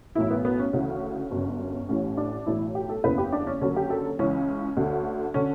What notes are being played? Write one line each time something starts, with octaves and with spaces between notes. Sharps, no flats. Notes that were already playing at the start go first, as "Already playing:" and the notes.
B1 A2 E3 E4
B3
B3
C#4
D2 C#3 E3
G1 F#2 C#3
A1 A2 E3 C#4
D4
B1 A2 E3 E4
G4
A4
F#1 E2 C#3 E3 B4
G4
D4
C#4
F#1 F#2 D3 C#4
G4
A4
C#2 C#3 E3 C#4
D2 D3
D3 C#4